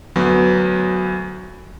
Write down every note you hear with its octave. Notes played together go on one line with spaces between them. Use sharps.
D2 F#3 B3